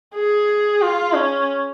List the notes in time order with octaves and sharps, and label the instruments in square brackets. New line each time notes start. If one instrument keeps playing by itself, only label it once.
[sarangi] G#4
F4
C#4